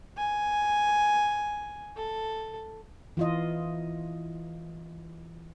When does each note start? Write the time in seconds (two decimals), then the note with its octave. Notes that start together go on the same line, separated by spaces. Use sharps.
0.17 G#5
1.97 A4
3.17 E3 F4 D#5